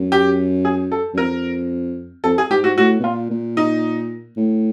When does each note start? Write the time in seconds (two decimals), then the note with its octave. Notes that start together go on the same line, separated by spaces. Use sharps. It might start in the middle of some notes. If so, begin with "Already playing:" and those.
Already playing: F#2
0.12 G4
0.65 G#4
0.92 A4
1.14 F#2
1.18 F2 A#4
2.24 F2 A4
2.38 G#4
2.50 G#2 G4
2.64 G#2 F#4
2.78 A2 F#4
3.00 B2
3.04 A#2 F4
3.30 A#2
3.57 D#4
4.37 A2